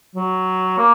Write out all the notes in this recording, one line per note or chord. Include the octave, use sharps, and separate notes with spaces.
F#3
A#3